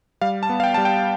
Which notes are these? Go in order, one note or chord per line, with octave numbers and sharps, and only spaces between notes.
G3 F5
A5
B3
F5
G5
G3 A5
G5